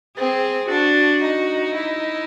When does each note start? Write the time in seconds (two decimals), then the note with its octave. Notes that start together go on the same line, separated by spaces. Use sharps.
0.17 C4 G#4
0.69 D4 F#4
1.23 D#4
1.76 E4